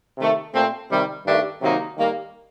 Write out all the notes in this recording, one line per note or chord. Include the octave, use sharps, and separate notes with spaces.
C3 D#3 A3
A#2 A3 C4
C3 D#3 G3
G2 D#3 A3 D4 G4
C3 D#3 F#3 A#3 D#4
D#3 G3 A#3